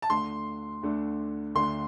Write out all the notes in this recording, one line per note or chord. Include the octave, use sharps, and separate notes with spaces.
A5
D2 D3 A3 D4 C6
D2 D3 A3 D4
D2 D3 A3 D4 C6